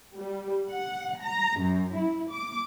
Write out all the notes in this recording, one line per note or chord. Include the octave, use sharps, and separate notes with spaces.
G3
F#5
A#5
F#2
E4
D6